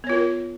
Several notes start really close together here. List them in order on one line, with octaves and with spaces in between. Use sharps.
B3 C#5 F4 A#4